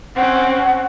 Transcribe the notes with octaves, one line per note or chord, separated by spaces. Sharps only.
C4 C#4 F#5